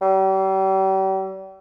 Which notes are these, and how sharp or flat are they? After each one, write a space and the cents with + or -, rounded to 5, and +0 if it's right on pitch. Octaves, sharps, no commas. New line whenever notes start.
G3 -40